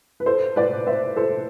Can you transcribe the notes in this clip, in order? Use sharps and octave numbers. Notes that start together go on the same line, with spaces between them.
B4
A4 C5
B4 D5
C5 E5
A4 C5